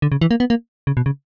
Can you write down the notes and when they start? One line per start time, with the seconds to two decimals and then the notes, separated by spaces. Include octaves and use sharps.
0.02 D3
0.12 C#3
0.21 E3
0.31 A#3
0.40 B3
0.50 A#3
0.87 C#3
0.97 B2
1.06 C#3